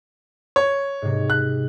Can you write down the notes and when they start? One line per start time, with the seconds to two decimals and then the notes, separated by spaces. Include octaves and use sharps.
0.56 C#5
1.02 G#2 C3
1.30 F#6